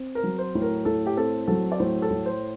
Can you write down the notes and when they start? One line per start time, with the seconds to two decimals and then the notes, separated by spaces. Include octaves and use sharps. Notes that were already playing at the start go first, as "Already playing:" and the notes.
Already playing: C4
0.15 A#4
0.24 F#3
0.39 C5
0.55 A2
0.62 A#4
0.85 A2 A4
1.06 G4
1.17 C4 A4
1.47 F#3 A4
1.72 D5
1.80 A2 C5
2.02 A4
2.10 A2
2.26 C5